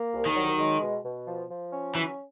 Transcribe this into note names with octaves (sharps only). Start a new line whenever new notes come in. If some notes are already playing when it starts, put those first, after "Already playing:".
Already playing: A#3
C2
D#3
F#3
G#3
B2
B2
F3
F3
C#4
E3 F#3